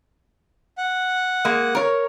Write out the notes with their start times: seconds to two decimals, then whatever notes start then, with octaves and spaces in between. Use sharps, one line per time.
0.78 F#5
1.45 G#3 A#3
1.75 A#4 C#5